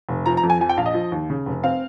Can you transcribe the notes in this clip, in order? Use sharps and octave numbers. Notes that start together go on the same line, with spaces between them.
F1
F3 A#5
A#5
F2
G#5
F3 G#5
G5
A#1 F5
D#5
F3
D#2
C#3
F1
C4 F5